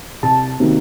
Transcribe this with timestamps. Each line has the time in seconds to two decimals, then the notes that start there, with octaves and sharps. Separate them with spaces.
0.23 C2 A5
0.60 C3 D#3 F#3 A#3